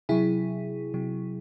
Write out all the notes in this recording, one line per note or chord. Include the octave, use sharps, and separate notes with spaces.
C3 F#3 E4 G#4
C3 F#3